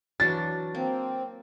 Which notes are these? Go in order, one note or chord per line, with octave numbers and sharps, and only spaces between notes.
E3 F#3 D4 A6
A#3 C4